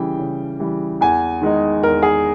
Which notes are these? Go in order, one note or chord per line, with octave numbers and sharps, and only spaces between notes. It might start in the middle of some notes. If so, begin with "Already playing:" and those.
Already playing: C#3 E3 G3 G5
C#3
E3 G3
E2 G#5
D#3 G#3 D#4
E2 A#4
G#4